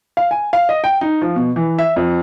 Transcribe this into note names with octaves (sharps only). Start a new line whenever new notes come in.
F5
G#5
F5
D#5
G5
D#4
F3
B2
E3
E5
F2